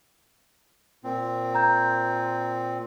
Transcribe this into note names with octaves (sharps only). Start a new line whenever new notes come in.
A#2 C4
A#5 G6